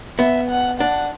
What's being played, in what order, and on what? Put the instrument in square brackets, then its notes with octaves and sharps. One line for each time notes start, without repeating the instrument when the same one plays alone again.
[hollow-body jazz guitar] B3 [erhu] E5
[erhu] F#5
[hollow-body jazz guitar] D4 [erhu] F#5